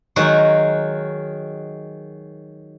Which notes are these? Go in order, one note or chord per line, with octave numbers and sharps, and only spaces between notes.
D#3 F#3 G#3 F#4